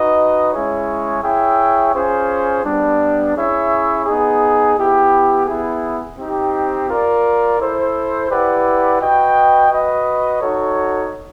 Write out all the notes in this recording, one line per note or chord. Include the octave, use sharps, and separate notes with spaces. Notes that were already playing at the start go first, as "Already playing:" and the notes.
Already playing: D#4 F#4 B4 D#5
G#3 C#4 E4 G#4 C#5
E4 G#4 C#5 E5 G5
C#4 F4 G#4 C5
G3 B3 D4
C#4 E4 G#4 C#5 E5
B3 D#4 G#4
B3 E4 G4
B3 E4 G#4
C4 D#4 G4
F4 A#4 D5
E4 A4 C5
E4 G4 B4 D5 F#5
F#4 B4 D#5 G5
F#4 B4 D#5
D#4 F#4 A4 C#5